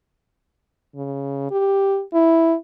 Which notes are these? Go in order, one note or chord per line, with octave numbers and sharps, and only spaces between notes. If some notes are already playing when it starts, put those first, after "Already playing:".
C#3
G4
E4